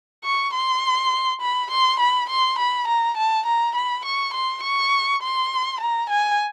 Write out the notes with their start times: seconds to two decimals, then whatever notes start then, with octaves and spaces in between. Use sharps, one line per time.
0.24 C#6
0.54 C6
1.41 B5
1.71 C6
2.00 B5
2.30 C6
2.59 B5
2.88 A#5
3.17 A5
3.46 A#5
3.75 B5
4.05 C#6
4.34 C6
4.63 C#6
5.22 C6
5.81 A#5
6.10 G#5